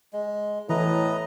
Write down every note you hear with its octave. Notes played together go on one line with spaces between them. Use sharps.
G#3
A2 E3 B4 D#5 A#5